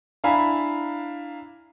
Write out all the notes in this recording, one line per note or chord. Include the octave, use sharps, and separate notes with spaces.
D4 E4 F5 G#5 A#5 B5